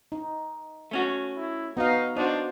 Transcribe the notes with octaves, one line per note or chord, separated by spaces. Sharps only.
D#4
A3 C#4 F#4
E4
B3 D#4 F#4 F5
D4 D#4 F#4 C5